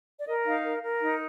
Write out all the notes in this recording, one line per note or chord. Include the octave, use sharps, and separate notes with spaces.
D5
A#4 D#5
D#4 F5
A#4
A#4
D#4